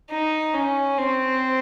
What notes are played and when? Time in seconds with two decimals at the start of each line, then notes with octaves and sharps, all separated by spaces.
0.11 D#4
0.54 C#4
0.98 C4